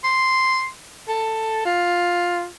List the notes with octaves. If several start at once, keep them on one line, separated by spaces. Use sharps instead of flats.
C6
A4
F4